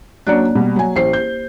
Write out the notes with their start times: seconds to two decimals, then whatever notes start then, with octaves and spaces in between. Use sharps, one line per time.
0.27 F#3 A#3 C#4 D4 D5 F#6
0.55 B2 G3
0.76 F#3 G#5
0.96 A1 G4 C5 C7
1.13 G6